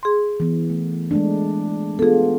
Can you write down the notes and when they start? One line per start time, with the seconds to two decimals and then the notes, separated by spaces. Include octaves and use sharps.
0.03 G#4 C6
0.40 E3 B3
0.70 A3
1.11 G#3 A3 D4
1.99 B3 F4 G#4 A4